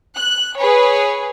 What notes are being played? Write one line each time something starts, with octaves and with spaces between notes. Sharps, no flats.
F#6
G#4 B4 C#5